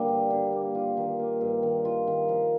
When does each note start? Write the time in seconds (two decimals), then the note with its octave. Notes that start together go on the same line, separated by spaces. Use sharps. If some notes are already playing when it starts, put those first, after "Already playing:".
Already playing: D3 G3 A#3
0.08 G2
0.30 D3
0.53 A#3
0.75 F4
0.97 D#3
1.19 A#3
1.41 G2
1.63 D#3
1.85 F4
2.07 D#3
2.29 F3